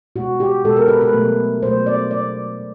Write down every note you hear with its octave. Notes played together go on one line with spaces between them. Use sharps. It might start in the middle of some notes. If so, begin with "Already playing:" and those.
B2 G#3 F#4
G4
B2 G#3 A4
A#4
B4
B4
B2 F#3 A3
B2 F#3 A3 C5
D5
B2 F#3 A3 D5
B2